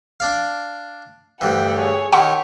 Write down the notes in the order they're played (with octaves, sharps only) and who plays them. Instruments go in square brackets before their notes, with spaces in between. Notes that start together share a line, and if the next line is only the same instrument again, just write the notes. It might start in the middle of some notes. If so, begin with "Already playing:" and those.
[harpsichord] D4 D5 F5
[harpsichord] D2 G2 E3 [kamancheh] F#5 G5
[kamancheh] G#4 C#5
[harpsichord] D#3 E4 [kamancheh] G4 C#5 [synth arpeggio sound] F#5 A5 C6